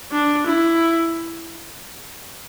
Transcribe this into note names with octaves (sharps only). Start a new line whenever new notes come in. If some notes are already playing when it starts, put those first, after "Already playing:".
D4
E4